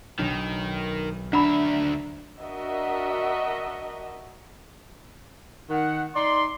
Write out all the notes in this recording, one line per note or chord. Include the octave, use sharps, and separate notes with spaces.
B1 D#3 D4
D2 D4 E5 F#5 A#5 B5
D4 F#4 A#4 D#5 E5
D#3 F#5
D#4 D5 C6